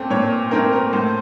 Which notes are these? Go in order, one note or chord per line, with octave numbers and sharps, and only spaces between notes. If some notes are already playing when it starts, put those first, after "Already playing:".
Already playing: A#2 A3 C4 A4
A#2 C#5
A3 C4 A#4
A#4
A2 C5